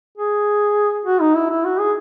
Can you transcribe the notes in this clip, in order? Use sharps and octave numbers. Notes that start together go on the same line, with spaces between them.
G#4
F#4
D#4
E4
E4
F#4
G#4